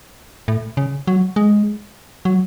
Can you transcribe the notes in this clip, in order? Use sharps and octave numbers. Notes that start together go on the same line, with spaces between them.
A2
C#3
F#3
G#3
F#3